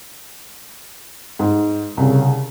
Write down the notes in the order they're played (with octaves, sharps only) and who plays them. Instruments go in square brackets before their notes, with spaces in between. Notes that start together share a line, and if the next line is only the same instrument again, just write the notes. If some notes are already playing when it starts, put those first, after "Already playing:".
[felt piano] G#2
[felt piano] C2 [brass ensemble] C#3